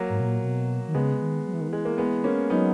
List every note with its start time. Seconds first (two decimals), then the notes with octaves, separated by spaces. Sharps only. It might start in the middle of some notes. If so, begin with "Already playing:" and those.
Already playing: F#3 A#3
0.09 G#2
0.20 B2
0.25 A#2
0.43 B2
0.88 D#3
0.94 C#3 G#3 B3
1.21 D#3
1.47 F#3
1.54 E3
1.61 D#3
1.68 E3 G#3
1.85 A#3
1.98 G#3 B3
2.24 A#3 C#4
2.49 F#3 B3 D#4